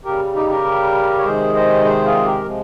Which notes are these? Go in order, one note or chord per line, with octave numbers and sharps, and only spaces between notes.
C#3 G3 G4 A#4
D#4 G4
G4 A#4
C#5
C3 D#3 G#3 G#4 C5
C5 D#5
G#4 C5
F4 G#4
G4 A#4
C3 F3 G#3